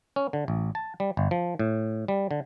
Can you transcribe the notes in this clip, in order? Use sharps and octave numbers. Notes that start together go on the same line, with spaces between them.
C#4
D3
A1
A5
G3
G1
F3
A2
G3
D3